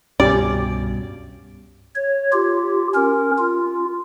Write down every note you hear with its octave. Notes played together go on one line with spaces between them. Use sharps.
C2 G2 B2 C#4 G4 D5
C#5
F4 G4
C#4 A#4
F4